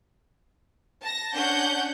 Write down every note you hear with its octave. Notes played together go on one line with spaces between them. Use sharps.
A5 A#6
C#4 D4 F#5 G6